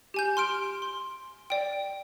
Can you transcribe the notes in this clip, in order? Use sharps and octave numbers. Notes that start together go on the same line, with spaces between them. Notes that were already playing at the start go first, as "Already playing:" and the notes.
G4 G#5 G6
C6 F6 D7
C6
D5 G5